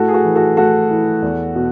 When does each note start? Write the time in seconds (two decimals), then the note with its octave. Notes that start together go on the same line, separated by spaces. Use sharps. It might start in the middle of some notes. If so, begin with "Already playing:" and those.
Already playing: A2 F#4 A4
0.08 G#4
0.14 F#4 A4
0.24 E3
0.35 F#4 A4
0.57 A2 F#4 A4
0.90 E3
1.22 E2
1.55 B2